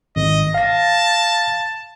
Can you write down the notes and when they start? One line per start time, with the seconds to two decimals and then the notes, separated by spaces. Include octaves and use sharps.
0.16 G#1 D#5
0.54 F5 A5 A#6